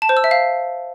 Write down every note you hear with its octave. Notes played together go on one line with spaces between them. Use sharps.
A5
C5
E6
E5
F5